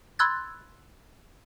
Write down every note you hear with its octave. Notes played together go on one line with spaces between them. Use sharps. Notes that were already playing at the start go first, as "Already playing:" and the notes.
B5 C6 E6 F#6 G#6 A6